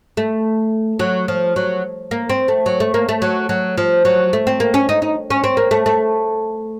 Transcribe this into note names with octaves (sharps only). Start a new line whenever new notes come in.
A3
F#3
F3
F#3
A#3
C4
A3
F#3
A3
A#3
A3
F#3
F#3
F3
F#3
A3
C4
A#3
C#4
D#4
D#4
C#4
C4
A#3
A3
A3